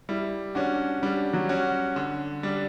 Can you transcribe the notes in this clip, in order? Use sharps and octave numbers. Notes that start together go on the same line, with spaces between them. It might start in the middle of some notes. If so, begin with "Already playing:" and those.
G3 E4
C#4 D4 F#4
G3 D4
F#3
C#4 F#4
D3
G3 D4